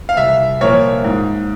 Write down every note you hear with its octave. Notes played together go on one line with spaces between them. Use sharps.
F5
C2 E5
A#2 F3 A#3 C#5
G#2